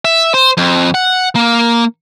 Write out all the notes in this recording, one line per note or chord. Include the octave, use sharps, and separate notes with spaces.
E5
C5
F2
F#5
A#3